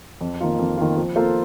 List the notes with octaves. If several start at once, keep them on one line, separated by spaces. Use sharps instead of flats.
F2
D#3 A#3 F4
F2
D#3 A#3 F4
F3
A#3 F4 A4 C5